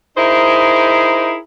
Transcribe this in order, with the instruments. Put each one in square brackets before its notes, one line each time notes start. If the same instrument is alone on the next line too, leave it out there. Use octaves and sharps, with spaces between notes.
[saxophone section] D#4 E4 G#4 A#4 C5 E5